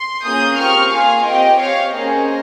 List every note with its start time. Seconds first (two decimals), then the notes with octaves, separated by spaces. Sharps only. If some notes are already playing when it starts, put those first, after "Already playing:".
Already playing: C6
0.24 A#3 C#4 F4 G#4 D#6 G6
0.58 C4 G4 C#6 F6
0.91 A#3 F4 G#4 F5 G#5
1.25 C4 G4 D#5 G5
1.59 C4 G4 C#5 F5
1.93 A#3 C#4 G#4 C5 D#5